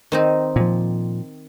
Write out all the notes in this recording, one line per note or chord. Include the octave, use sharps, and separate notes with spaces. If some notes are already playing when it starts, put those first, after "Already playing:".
D#3 C4 D#4
A#2 F3